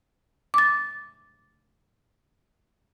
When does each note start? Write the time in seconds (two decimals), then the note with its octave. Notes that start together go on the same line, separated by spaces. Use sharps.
0.54 D6 A6